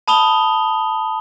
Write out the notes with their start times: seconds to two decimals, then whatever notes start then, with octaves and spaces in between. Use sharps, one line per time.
0.08 A5 B5 D#6 F7 G7